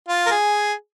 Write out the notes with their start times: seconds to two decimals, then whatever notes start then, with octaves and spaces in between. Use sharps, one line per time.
0.08 F4
0.26 A#4
0.31 G#4